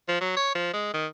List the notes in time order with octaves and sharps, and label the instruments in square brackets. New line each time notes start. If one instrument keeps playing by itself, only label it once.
[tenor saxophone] F3
F#3
C#5
F3
G#3
D#3